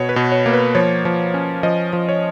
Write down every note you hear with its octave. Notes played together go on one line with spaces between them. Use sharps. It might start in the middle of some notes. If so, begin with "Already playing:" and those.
Already playing: B2 C#5
B4
B2
C#5
A#3
B4
F3 C#5
F3
C#4
F3 D#5
F3
C#5